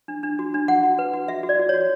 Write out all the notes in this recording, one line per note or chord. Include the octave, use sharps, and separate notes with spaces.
D4
D4
F#4
D4
F#4 F#5
F#4
B4
F#4
F#4 E5
F#4
D5
F#4
C#5
F#4